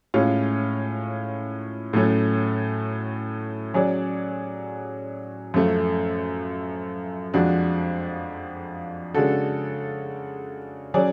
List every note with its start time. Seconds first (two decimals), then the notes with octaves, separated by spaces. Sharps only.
0.14 A2 G#3 C#4 F4
1.93 A2 F#3 A3 C#4
3.74 F#3 C#4 G#4 D5
5.54 F#2 F3 A3
7.34 F2 F3 G#3 D4 F#4
9.14 C#3 G#3 D4 F#4 A4
10.94 F#3 C#4 G#4 D5